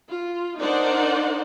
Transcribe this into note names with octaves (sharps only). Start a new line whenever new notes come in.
F4
D4 D#4 A#4 C5 D5 F#5